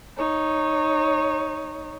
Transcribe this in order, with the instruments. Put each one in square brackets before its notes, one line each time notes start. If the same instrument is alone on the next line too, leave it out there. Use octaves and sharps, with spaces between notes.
[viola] D#4 C#5